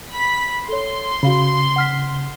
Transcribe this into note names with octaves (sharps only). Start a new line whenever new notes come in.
B5 B6
A4 C#5 C6
C#3 F#4 F5 B5
F#5 F6 B6